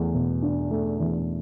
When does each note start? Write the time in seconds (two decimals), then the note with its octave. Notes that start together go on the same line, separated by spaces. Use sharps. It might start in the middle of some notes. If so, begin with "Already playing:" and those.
Already playing: E2 A3
0.14 B2
0.42 D4
0.71 A3
1.00 E2